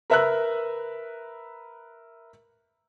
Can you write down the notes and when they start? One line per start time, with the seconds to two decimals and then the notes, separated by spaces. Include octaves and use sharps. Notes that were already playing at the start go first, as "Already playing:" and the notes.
0.10 A#4 B4 E5 A#5 E6 F#6